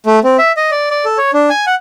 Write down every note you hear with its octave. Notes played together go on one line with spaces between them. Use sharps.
A3
C4
E5
D#5
D5
D5
A4
C#5
D4
G#5
F#5